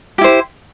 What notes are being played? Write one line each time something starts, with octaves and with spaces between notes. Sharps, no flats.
E4 G4 C5